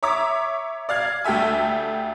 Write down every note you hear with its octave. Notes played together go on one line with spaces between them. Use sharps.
C#5 E5 A#5 D6
D5 F5 F6 G#6
D2 G4 A4 E5 G#5